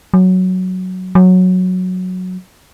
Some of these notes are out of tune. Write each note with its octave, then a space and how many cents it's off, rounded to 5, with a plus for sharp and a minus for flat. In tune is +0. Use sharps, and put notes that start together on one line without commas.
F#3 +0
F#3 -10